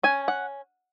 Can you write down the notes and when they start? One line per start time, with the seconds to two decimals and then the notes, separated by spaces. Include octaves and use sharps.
0.03 C#4 G#5
0.28 F#5